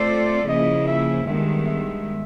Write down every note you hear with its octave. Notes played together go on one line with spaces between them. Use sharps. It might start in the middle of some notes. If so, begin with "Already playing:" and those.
Already playing: A3 C4 F4 A4 C5 D5
C#3 F3 A#3 C#4 E4 D#5
E5
G2 D#3 G#3 B3 E5
E5